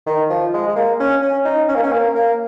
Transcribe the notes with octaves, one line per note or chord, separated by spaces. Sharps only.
D#3
F3
G#3
G#3
A#3
C#4
C#4
D#4
C#4
A#3
C#4
A#3
A#3